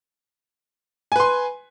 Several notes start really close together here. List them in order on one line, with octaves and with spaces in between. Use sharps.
G#5 B4 C6